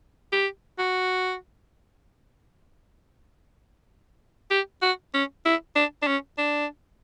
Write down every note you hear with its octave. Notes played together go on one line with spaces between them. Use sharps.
G4
F#4
G4
F#4
C#4
E4
D4
D4
C#4
D4